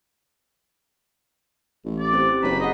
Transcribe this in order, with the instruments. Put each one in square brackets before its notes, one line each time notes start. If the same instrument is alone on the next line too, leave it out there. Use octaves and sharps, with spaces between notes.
[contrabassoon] A1
[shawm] D5
[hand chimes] C4 G4 C5
[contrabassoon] F#1 [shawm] B4 [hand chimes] C#5 A#5
[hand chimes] G#4 F#5 [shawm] D#5